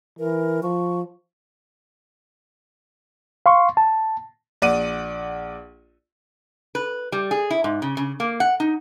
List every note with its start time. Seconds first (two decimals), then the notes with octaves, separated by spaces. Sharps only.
0.19 E3 A#4
0.63 F3 C#6
3.46 F5 C6 C#6
3.77 A5
4.62 A#1 D5 F#5 D#7
6.75 B4
7.12 G3
7.31 G#4
7.50 E4
7.64 G#2
7.82 C#3
7.97 C#3
8.20 A#3
8.40 F#5
8.60 D#4